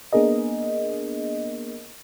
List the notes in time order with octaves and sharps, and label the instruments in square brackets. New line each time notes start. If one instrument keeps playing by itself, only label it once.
[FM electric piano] A#3 B3 D4 G#4 A#4 D#5